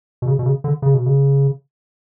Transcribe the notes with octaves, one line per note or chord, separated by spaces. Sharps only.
B2
C#3
B2
C#3
D3
C#3
B2
C#3